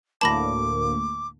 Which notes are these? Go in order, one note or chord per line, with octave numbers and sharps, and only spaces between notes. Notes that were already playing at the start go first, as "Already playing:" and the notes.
D2 A2 A#3 A5 B5 D6 A#6